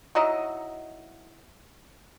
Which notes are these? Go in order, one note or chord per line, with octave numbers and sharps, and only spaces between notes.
F#3 D#4 E4 D#5